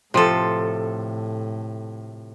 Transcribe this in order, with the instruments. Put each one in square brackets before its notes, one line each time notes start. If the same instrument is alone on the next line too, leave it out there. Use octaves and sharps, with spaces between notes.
[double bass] A2 [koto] C3 A4 [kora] F3 C5